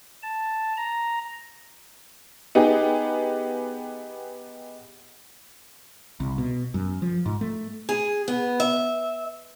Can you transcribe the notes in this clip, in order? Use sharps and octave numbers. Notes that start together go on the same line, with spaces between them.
A5
A#5
B3 D#4 G4 G#4
C2
B2
F#2
F3
G#2
A3
G#4
B3
E5